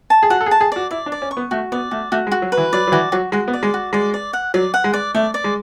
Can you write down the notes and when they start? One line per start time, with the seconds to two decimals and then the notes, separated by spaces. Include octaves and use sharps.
0.10 A5
0.23 G#4
0.30 F#4 F#5
0.41 A4
0.46 G#4
0.51 A5
0.61 G#4
0.72 F#4 D5
0.91 E4 D5
1.06 D4
1.12 D5
1.22 C#4
1.31 C#6
1.37 B3
1.51 A3 F#4
1.72 B3 D5
1.91 A3 F#4
2.12 A3 F#4
2.27 G#3
2.32 F#4
2.42 F#3
2.52 B4
2.57 E3
2.73 F#3 D5
2.87 F#3
2.92 E3 F#4
3.12 F#3 F#4
3.32 G#3 F#4
3.48 B3
3.53 D5
3.63 G#3
3.74 F#4
3.93 G#3 D5
4.14 D5
4.33 F#5
4.54 F#3 D5
4.74 F#5
4.84 G#3
4.94 D5
5.15 A3 D5
5.34 D5
5.44 G#3